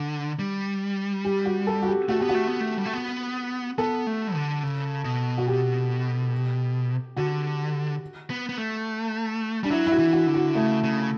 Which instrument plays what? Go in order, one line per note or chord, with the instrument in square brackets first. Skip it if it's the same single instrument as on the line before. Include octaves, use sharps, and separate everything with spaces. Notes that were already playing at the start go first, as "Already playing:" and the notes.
Already playing: [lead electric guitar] D3
G3
[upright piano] G4
F#4
A4
F#4
G4
[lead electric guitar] A3 [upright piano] F#4
[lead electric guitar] B3 [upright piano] G4
[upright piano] F#4
[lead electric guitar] A3
B3
A3
G3
A3
B3
[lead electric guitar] B3 [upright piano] A4
[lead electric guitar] A3
D3
C#3
B2
[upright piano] F#4
G4
[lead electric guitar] D3 [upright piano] F#4
[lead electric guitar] B3
B3
A3
[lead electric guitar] G3 [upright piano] D4
[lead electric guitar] F#3 [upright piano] E4
[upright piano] E4
F#4
[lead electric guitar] E3
[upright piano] F#4
[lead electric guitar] D3
[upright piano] F#4
[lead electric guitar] C#3 [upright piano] A3
[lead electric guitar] C#3